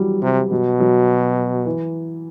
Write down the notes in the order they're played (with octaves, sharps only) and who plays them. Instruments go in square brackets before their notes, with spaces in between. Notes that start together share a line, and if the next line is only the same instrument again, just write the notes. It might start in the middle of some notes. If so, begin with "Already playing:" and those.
Already playing: [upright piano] E3 F#3 G3
[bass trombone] C3
[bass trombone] B2 [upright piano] F#3
[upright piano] F#3
E3